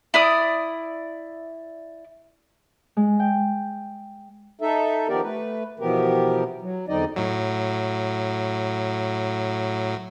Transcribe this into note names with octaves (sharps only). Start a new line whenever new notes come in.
E4 D5 D#6
G#3
G5
D#4 A4 E5
D#3 F3 B3 G4 A#4 D5
A3 B4
B2 E3 F3 B3 G4 A#4
F#3
E2 D3 C4 D#4 D5 D#5
A2 F#3